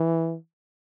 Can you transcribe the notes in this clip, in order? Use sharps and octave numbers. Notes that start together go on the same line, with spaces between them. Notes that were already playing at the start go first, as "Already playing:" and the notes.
Already playing: E3